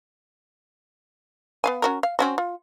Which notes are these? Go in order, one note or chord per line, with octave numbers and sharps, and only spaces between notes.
B3 F5 G#5
C#4 F#4 A#4
F5
C4 C#4 F#4
F4